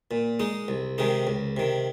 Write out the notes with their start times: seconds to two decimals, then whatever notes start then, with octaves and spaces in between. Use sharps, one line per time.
0.11 A#2
0.40 G#3 D#4
0.68 C2
0.98 C3 D#3 G#3 D#4
1.27 C#2
1.57 C3 D#3